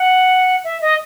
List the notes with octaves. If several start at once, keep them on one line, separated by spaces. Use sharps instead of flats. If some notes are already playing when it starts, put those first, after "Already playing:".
Already playing: F#5
E5
D#5